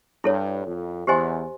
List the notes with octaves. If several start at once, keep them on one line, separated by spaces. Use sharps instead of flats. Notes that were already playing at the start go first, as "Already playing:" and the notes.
G2 E4 A4 C#5
F2
E2 G4 C5 D#5 G#5 C6